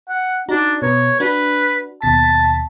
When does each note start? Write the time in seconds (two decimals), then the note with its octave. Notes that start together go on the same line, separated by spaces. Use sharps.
0.09 F#5
0.49 D4 D#4 F#4 A#5
0.82 B2 B4 C#5 A#5
1.20 D4 F#4 B4
2.02 D#2 B2 A5 B6